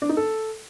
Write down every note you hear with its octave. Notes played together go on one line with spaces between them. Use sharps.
D4
D#4
A4